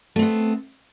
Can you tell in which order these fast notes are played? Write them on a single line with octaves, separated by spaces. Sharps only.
A3 C4 B3